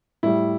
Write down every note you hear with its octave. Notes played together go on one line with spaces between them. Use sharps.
A2 G3 E4